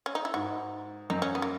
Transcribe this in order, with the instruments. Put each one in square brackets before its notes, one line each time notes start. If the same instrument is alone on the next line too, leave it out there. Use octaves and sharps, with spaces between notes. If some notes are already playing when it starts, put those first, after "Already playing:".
[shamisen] C#4
D#4
E4
[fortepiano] G#2 [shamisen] F#4
[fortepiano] F#2 [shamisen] D#4
[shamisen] C#4
B3
A#3